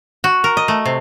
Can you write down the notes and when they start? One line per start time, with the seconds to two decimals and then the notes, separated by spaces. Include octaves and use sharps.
0.24 F#4
0.44 A#4
0.57 D#5
0.68 A3
0.85 C3